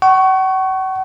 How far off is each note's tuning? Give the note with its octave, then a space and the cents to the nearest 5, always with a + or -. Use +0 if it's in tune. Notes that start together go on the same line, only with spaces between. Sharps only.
F#5 +40 C#6 +0